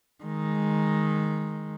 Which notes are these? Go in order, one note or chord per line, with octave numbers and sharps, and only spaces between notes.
D#3 G#3